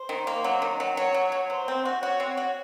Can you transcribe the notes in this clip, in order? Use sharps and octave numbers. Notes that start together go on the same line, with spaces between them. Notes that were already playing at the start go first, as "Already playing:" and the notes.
Already playing: C5
D#3
A#3
F#3
D#3
F#3
F#3 C#5
F#3
F#3
F#3 C5
C4
F#4
F#4 C#5
C4
F#4